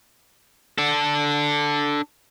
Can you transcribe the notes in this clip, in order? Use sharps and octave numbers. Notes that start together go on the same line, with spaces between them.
D4 A4